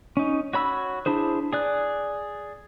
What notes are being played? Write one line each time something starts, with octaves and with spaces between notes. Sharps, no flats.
C#4 D#4
F#4 C#5 B5 E6
D4 E4 G#4 C5
G#4 D5 F#6